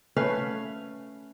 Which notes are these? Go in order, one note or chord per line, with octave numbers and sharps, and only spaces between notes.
A3 C#4 B4 F5